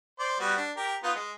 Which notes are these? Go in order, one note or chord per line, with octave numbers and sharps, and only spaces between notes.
C5 D5
G3 B3 F#4
D4
G4 A#4
B3 D#4 F4
G#3